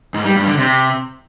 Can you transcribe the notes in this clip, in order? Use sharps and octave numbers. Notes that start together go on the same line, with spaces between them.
G#2
G3
G2
D3
C3